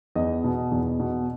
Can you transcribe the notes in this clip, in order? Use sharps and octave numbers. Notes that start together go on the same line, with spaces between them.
E2 D#5
B2
E2
B2